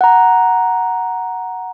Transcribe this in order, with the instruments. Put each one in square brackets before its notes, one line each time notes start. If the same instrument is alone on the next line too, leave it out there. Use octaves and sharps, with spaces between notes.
[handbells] F#5 A#5